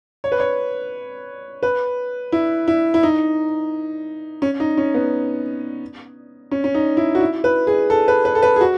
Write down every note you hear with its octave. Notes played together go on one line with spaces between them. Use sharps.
C#5
B4
C#5
B4
E4
E4
E4
D#4
C#4
D#4
C#4
B3
C#4
C#4
D#4
E4
F#4
E4
B4
G#4
A4
B4
B4
A4
B4
G#4
F#4